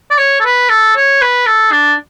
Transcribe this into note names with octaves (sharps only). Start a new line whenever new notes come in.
D5
C#5
A4
B4
A4
C#5
B4
A4
D4